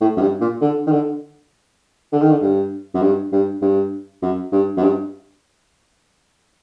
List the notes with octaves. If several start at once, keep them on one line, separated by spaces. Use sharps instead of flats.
A2
F#2
G2
A#2
D3
D#3
D3
D3
D#3
D3
G2
F#2
G2
G2
G2
F#2
G2
F#2
G2